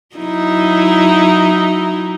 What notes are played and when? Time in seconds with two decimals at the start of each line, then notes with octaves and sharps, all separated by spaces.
0.16 F#3 D#4 E4